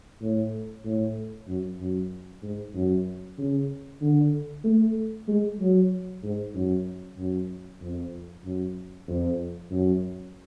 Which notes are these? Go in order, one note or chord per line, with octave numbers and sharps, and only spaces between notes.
A2
A2
F#2
F#2
G#2
F#2
C#3
D3
A3
G#3
F#3
G#2
F#2
F#2
F2
F#2
F2
F#2